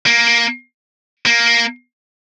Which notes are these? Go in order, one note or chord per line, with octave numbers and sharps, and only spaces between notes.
A#3
A#3